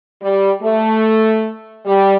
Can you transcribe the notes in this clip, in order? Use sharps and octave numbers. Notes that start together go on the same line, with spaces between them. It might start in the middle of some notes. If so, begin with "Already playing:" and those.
G3
A3
G3